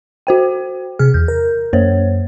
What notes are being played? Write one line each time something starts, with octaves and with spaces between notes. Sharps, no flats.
F#4 C5 G5
C3 G#4 F6
E2 G6
A#4
F#2 A#3 C5 C#5